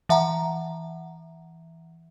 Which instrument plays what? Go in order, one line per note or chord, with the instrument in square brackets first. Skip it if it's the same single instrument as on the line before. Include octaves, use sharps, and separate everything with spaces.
[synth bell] E3 E5 F#5 A#5